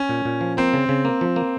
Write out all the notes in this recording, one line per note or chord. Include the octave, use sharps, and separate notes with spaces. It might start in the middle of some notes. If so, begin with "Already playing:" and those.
Already playing: C#4
A#2
A#2
F3
A#3 C4
C#3
C#3
A#3
F3
A#3